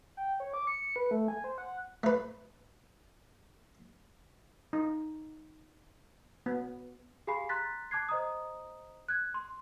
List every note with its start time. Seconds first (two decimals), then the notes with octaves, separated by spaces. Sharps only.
0.17 G5
0.40 C#5
0.54 D6
0.67 C#7
0.96 B4
1.11 A3
1.28 G#5
1.44 C5
1.58 F#5
2.03 A3 B4
4.73 D#4
6.46 B3
7.27 G4 G#4 F5 G#5 B5 C7
7.49 A#5 C6 F#6 A6 B6
7.91 A5 D6 F#6 G#6 C7
8.09 C5 D#5 A#5 D#6
9.08 F#6 G#6
9.34 C6